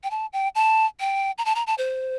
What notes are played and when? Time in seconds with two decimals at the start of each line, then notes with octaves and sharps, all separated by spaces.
0.03 G5
0.10 A5
0.33 G5
0.55 A5
1.00 G5
1.38 A#5
1.45 A5
1.55 A#5
1.67 A5
1.78 C5